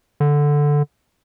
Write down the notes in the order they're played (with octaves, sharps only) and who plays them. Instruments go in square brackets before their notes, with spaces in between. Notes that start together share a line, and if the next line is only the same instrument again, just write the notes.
[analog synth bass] D3